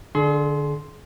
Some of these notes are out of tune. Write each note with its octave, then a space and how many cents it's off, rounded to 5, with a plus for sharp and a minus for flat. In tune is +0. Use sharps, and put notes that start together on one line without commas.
D3 +10 G#4 +45 C6 +0